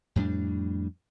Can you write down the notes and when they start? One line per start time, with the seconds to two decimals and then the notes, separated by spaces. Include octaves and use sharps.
0.16 F2 A2 G3 D4